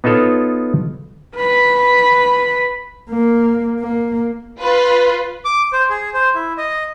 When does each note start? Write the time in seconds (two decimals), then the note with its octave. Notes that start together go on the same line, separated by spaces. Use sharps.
0.04 B3 D#4 F4 A4 C#5
1.35 B4 B5
3.10 A#3
3.80 A#3
4.60 F4 B4
5.45 D6
5.73 C5
5.90 G#4
6.14 C5
6.35 E4
6.58 D#5